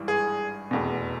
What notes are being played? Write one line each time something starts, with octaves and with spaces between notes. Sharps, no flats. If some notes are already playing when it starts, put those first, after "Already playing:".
Already playing: G#1 G2 E3 G3
G#4
F1 E2 B2